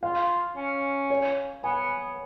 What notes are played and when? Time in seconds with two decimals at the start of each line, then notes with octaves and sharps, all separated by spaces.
0.03 F4 F5
0.56 C#4
1.10 C#5
1.64 B3 G#5